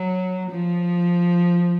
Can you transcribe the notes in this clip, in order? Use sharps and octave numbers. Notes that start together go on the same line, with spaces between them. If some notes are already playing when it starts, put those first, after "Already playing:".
Already playing: F#3
F3